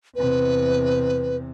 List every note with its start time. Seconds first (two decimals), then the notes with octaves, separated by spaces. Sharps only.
0.16 E2 C3 B4